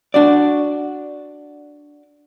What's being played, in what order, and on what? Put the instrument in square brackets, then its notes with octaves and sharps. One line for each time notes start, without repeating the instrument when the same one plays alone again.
[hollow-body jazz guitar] D4 F#4 D5